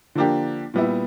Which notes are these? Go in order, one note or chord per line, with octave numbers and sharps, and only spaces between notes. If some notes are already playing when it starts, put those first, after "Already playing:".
D3 F3 A#3 D4 G4
A#2 G3 B3 E4